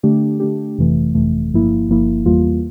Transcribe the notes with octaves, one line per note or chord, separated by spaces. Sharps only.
D3 A3 D4 G4
D3 A3 D4 G4
G1 F2 C3 E3 A3
G1 F2 C3 E3 A3
G1 G2 F3 A#3 E4
G1 G2 F3 A#3 E4
E2 E3 G3 A#3 F4